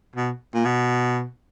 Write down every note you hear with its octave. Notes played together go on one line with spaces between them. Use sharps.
B2
A#2
B2